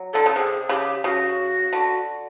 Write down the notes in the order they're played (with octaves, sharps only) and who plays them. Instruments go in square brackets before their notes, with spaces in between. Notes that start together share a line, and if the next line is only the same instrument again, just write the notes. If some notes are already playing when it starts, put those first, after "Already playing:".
Already playing: [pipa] F#3
[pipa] D3 [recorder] A4
[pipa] C#3
[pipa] C3 [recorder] G#4
[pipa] C#3 [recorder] G4
[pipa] C#3 [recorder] F#4
[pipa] D3